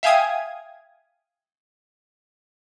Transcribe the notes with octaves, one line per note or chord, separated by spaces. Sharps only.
E5 F5 G5 G#5 D#6 G#6